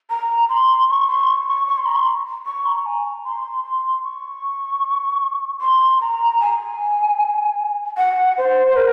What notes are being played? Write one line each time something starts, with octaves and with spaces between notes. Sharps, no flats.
A#5
C6
C#6
C6
C#6
C#6
C#6
C6
A#5
C6
C#6
A#5
G#5
A#5
C6
C6
C#6
C6
A#5
G#5
F#5
C5
A#4